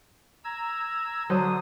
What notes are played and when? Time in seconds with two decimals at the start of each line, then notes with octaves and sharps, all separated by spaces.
0.44 A#5 E6 G#6
1.30 D3 F#3 C5 D#6